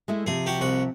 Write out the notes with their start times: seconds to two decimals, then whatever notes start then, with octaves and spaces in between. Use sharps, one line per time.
0.08 G#3 A3 E4
0.27 C3 F3 G#4
0.46 F#4 G4
0.61 C2 F#4